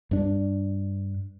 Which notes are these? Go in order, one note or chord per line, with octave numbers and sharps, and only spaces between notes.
G2 D4